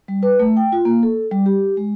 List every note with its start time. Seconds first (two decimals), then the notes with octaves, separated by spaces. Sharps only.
0.08 G3
0.23 B4
0.39 A3
0.57 G5
0.72 F4
0.85 A#3
1.03 A4
1.31 G3
1.46 G4
1.77 G#3